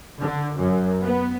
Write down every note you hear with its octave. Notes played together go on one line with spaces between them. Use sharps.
D3
F#2
B3